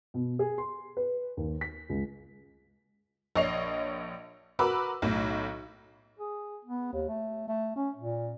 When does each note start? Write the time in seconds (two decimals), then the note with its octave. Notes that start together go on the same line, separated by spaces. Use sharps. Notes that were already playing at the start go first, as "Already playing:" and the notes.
0.14 B2
0.39 G#4
0.58 C6
0.97 B4
1.37 D#2
1.61 B6
1.89 C#2
3.36 A#1 C#5 D#5 C7 F7
4.59 F#4 A#4 B4 B5 D6 E6
5.02 B1 A2
6.19 G#4
6.65 B3
6.92 D#2
7.08 A3
7.48 A3
7.76 C#4
7.96 A#2